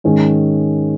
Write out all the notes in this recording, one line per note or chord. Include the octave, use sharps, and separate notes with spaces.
G#2 D#3 C#4 G#4